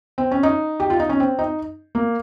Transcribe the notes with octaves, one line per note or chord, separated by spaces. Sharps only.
C4
C#4
D#4
G4
F4
D#4
C#4
C4
D#4
A#3